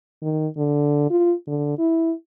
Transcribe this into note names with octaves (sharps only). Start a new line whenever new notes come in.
D#3
D3
F4
D3
E4